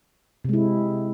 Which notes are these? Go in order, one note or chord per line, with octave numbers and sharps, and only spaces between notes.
C3 G#3 E4